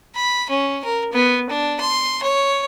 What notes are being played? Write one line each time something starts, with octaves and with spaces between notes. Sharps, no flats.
B5
C#4
A#4
B3
D4
C6
C#5